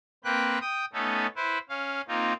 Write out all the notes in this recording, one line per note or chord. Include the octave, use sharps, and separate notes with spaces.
A#3 C4 B4 G5 F#6
G5 D#6
A3 B3 C#4 D#4 A4
E4 B4 C5
C#4 F5
A#3 C4 D#4 F4